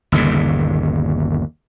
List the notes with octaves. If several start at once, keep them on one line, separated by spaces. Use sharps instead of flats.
G1 D#2 A#2 C#3